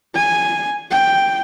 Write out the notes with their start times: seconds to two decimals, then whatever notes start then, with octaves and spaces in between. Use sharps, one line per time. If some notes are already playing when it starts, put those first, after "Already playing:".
0.15 G#5
0.91 G5